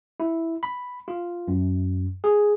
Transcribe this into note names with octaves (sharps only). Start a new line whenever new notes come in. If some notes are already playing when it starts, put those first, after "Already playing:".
E4
B5
F4
F#2
G#4